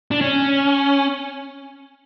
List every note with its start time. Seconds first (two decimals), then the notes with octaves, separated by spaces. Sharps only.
0.11 D4
0.21 C#4